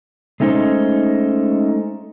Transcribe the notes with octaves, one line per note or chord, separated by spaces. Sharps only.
G#3 A3 C#4 D#4 C5